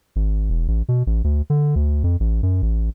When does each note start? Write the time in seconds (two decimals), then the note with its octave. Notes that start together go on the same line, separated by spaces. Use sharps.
0.16 G#1
0.50 E1
0.68 A1
0.89 B2
1.07 A1
1.24 D2
1.50 D3
1.76 D2
2.04 F2
2.20 A1
2.43 F#2
2.62 A1